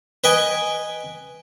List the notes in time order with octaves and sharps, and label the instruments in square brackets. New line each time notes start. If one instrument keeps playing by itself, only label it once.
[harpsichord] B4 D#5 G5 G#5